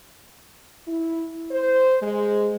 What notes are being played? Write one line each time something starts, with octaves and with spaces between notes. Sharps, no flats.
E4
C5
G#3